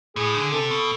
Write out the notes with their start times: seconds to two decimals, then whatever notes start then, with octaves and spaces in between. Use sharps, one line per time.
0.16 A2 G#4
0.35 D3
0.52 C3 A4
0.71 B2